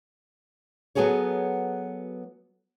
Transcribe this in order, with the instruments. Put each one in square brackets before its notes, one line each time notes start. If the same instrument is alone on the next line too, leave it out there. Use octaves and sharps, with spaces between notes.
[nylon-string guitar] F#3 B3 F#4 G#4 A4 C#5